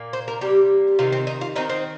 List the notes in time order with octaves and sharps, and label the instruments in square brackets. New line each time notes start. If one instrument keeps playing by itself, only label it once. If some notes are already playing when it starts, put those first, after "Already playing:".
Already playing: [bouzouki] A#2 A#3
C5
A#4
C3 G3 A#3 G4
C3 D#3 C4 F4
C4
D#4
F4
D#3 C4 D#4
C4